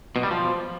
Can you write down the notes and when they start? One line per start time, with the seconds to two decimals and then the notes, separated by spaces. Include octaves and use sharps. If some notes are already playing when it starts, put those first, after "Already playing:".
0.16 B2
0.23 G3
0.31 F3